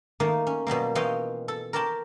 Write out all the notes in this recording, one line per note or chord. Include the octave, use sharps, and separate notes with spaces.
D#3 A3 A#3 D#4
C#4
B2 F#3 G3 A#3
E3 F4 C#5 D#5 F5 G5
A4
A#4 C#5 D5 G5 A5 B5